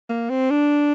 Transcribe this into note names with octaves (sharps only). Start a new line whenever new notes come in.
A#3
C4
D4